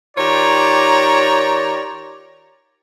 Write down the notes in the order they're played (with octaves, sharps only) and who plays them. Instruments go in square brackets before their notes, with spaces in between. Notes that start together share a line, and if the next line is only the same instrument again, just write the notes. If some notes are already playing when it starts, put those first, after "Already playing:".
[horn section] D#3 F4 G4 C#5 D5 A#5